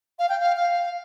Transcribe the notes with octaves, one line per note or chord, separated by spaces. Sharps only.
F5
G5
F5
F5